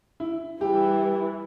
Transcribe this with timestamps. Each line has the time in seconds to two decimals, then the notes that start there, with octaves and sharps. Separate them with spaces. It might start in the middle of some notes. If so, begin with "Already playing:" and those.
0.20 E4
0.60 E3 G3 E4 G4